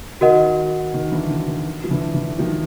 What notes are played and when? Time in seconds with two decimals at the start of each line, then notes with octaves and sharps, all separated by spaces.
0.21 D#3 F#4 A#4 D#5 F#5
0.94 D#3
1.12 D3 E3
1.30 D3
1.48 D#3
1.84 F3
1.91 D3 E3
2.14 D3 E3
2.39 D#3 F3